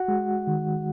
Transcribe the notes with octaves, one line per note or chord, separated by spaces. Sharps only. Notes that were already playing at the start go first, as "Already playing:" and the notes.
Already playing: F#4 F#5
G#3
D#3